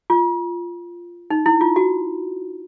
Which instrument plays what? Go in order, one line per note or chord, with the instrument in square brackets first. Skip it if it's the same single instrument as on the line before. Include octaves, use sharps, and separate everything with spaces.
[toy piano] F4
D#4
E4
F4
F#4